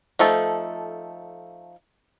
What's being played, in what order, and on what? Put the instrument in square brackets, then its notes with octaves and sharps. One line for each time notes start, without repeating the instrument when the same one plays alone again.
[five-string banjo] F3 A3 D#4 A4